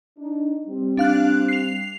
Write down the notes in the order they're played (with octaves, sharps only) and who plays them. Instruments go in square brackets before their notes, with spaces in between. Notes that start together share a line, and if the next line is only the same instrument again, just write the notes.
[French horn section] D4 D#4
G3 C4
[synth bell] D4 F5 F#6
C7 F7